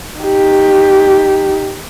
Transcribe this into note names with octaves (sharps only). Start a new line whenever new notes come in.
D#4 G4